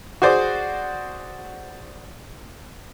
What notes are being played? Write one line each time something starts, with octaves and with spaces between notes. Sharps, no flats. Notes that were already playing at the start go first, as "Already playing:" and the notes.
F#4 G#4 C5 D5 D6